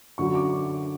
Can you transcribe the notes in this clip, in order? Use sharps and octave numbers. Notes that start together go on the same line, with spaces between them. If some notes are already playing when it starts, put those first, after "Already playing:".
F#2 D3 F#3 C#6
D6